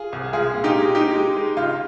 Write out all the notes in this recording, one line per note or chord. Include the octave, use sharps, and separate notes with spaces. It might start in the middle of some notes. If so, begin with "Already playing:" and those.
Already playing: F4 G#4
C2
G#3 F4 G#4
A#2
D#4 G4
G#3
G#3 D#4 G4
G#3
G#3
C#2 F4